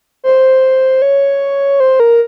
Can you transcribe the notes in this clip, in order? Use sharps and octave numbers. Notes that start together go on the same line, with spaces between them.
C5
C#5
C5
A#4